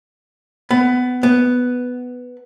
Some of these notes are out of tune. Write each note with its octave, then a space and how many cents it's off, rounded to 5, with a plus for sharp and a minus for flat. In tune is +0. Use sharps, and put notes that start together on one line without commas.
B3 +20
B3 +5